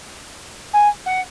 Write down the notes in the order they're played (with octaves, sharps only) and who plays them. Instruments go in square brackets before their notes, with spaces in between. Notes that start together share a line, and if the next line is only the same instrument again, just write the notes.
[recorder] G#5
F#5